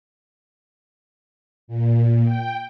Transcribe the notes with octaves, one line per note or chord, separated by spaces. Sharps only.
A#2
G5